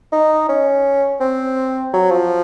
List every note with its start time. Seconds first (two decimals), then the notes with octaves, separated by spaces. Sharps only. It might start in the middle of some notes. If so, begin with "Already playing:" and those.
0.12 D#4
0.49 C#4
1.20 C4
1.93 F#3
2.11 F3